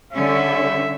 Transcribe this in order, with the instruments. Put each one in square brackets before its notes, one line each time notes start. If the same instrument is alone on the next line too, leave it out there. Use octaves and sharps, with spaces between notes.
[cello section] D3 G3 C#4 [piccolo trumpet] E5